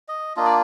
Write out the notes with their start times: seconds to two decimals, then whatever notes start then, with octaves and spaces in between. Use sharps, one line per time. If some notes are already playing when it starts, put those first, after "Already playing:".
0.08 D#5
0.37 A#3 D4 F4 D#5
0.45 D5